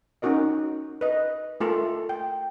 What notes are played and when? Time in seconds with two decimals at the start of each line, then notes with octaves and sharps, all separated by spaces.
0.22 C#4 D#4 F#4 A#4 D#5
1.01 B4 D#5
1.60 A3 F4 A4 A#4 A5
2.09 G5